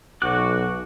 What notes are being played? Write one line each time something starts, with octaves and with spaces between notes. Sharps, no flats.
B1 F#4 D6 F#6